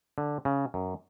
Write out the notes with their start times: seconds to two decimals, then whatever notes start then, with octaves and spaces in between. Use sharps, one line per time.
0.18 D3
0.45 C#3
0.74 F#2